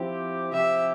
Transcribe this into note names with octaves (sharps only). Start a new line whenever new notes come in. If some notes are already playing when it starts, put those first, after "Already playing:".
Already playing: F3 C4 E4 G4
C3 F3 C4 E4 G4 E5